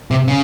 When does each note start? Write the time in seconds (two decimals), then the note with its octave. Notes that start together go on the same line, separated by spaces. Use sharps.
0.11 C3
0.28 C#3